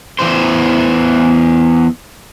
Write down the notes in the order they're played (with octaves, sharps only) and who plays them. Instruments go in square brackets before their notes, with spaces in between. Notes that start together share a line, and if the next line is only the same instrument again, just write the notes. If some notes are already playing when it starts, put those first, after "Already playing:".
[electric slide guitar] E2 B2 E3 C5